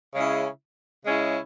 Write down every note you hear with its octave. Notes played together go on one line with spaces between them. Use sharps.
C#3 G#3 C#4 E4
C#3 G#3 C#4 E4